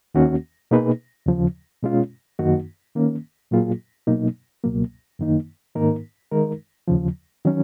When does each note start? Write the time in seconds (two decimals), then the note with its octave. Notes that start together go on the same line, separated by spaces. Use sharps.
0.14 D#2 D#3 A#3 C#4 F#4
0.71 B2 A#3 D#4 G#4 B4
1.26 D#2 C#3 F3
1.83 B2 G#3 C#4 F4
2.39 F#2 D#3 A#3 D#4 F#4
2.95 D#3 A#3 C#4
3.51 A#2 F#3 A#3 F4 G#4
4.07 B2 F#3 A#3 D#4
4.64 C#2 B2 F#3 A#3
5.19 F#2 D#3 A#3 D#4
5.75 G#2 D#3 A#3 D#4 A#4
6.31 D#3 G#3 D#4 A#4
6.88 D#2 C#3 F3
7.45 D#3 F#3 C#4